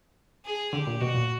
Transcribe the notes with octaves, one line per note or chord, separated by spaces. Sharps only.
G#4
D3 G4
A#2
B2 F#4
A#2